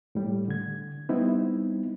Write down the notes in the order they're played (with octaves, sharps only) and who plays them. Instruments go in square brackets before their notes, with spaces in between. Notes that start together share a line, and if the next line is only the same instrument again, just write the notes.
[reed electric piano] A2 G3
D3 G#6
G3 B3 C4 D#4 E4